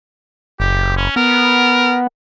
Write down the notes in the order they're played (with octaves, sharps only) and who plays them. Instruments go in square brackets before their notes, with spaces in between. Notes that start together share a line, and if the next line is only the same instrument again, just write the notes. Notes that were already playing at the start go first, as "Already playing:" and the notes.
[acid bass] F#1 [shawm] G4
[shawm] C#4
[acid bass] B3 [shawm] A#4